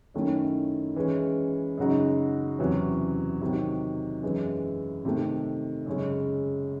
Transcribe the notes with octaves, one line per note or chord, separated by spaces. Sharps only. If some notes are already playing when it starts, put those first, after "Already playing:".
F#2 D#3 A3 C#4 E4
E3 G#3 C#4
F#2 C#3 G#3 D#4 F#4
E2 C3 F#3 C#4 E4
C3 D#3 F#3
F#2 E3 G#3
C3 D#3 A3
F#2 C#3 G#3 C#4